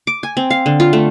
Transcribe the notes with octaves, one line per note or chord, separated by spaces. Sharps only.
D6
G#5
C4
F5
D3
F4
A3